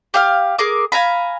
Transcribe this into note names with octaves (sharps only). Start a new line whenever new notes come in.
G4 F5 F6
G#4 A#4 D6
F5 G#5 A#5 B5